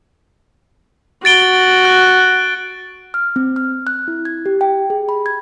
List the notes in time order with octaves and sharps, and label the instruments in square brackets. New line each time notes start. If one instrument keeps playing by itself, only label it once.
[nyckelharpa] F#4 [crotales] A6 D7 G7
[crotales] F#6
[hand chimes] F6
C4
F6
F#6
E4
G#6
G4
G5
G#4
B5
G#6